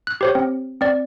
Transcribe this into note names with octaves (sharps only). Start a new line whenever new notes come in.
F#6
G4 C5 C#5
C4
C4 D5